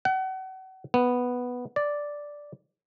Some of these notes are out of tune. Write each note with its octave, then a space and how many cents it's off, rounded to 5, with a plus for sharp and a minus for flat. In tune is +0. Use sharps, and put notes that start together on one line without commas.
F#5 +35
B3 +0
D5 -5